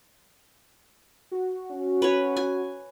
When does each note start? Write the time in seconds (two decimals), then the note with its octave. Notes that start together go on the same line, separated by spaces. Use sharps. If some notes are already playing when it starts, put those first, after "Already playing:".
1.31 F#4
1.71 C#4
2.02 B4 C#5
2.36 G#5